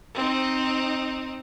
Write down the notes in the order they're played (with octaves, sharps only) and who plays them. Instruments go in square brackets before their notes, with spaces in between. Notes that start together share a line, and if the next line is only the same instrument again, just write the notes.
[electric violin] C4 D#4